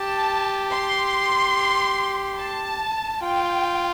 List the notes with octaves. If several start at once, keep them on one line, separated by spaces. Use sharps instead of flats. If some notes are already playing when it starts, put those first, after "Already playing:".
Already playing: G4 A5
C6
A5
F4 G5